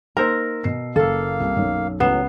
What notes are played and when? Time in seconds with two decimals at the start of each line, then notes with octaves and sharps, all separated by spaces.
0.17 A#3 D#4 A#4 C5 A#5 E6
0.64 B2 C7
0.96 F#1 A#3 A4 F5 E6
1.40 C2
1.56 B1 F#2
2.00 C#2 A2 F#3 B3 C7 E7